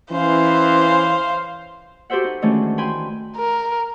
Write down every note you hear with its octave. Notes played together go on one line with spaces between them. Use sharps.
E3 C#4 C5 F5
F#4 G4 A4 C5 E5 F#5
D#4
D#3 E3 G#3 A3 C#4 D4
G5 G#5 B5 C6
A#4